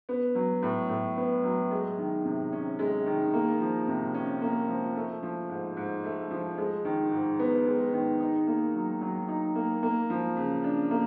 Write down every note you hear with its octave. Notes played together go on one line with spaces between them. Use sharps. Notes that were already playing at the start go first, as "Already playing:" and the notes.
B3
F#3
A2
A2
B3
F#3
G#3
D#3
C3
C#4
G#3
D#3
A#3
F3
C3
C#4
A#3
F3
A3
F3
G#2
G#2
A3
F3
G#3
D#3
G#2
B3
G#3
D#3
D#4
A#3
F#3
F#3
D#4
A#3
A#3
F3
C#3
D4
A#3